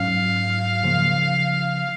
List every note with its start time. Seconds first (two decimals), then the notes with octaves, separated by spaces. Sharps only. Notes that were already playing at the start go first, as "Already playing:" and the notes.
Already playing: G#2 F#3 C#4 F5
0.83 C#3 F3 A#3